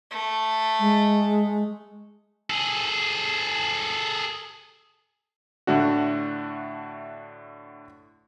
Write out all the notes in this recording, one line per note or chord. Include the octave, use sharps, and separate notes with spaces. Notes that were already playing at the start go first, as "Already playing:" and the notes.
A3
G#3
G#4 A4
A2 D3 A3 D4 F#4